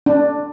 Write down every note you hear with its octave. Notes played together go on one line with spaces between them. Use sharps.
D4